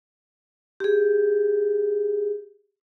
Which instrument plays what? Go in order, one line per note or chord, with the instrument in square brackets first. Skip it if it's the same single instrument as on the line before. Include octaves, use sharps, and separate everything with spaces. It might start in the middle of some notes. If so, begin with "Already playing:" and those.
[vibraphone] G4 G#4